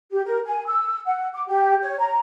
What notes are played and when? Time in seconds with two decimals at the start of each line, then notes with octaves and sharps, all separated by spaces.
0.11 G4
0.25 A#4
0.45 G#5
0.67 E6
1.06 F#5
1.34 D6
1.48 G4
1.81 C#5
1.99 A#5